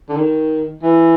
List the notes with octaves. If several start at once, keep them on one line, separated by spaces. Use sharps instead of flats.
D3
D#3
E3